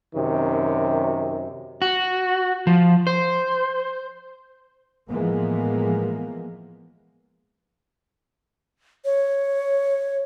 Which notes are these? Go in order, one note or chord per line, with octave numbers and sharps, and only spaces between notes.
F#2 C3 D#3
F#4
F3
C5
A2 E3 F3 G#3 A#3 B3
C#5